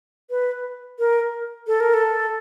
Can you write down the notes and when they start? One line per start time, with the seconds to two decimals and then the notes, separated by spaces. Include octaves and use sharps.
0.30 B4
0.99 A#4
1.67 A4
1.80 A#4
1.94 A4